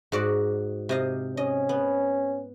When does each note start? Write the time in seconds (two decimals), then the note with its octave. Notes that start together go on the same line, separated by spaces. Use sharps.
0.12 G#2 F#4 D5
0.89 C3 D#5 F5
1.37 C#4 D#5
1.69 B3